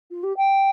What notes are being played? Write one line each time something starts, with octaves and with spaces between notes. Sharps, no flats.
F4
G4
G5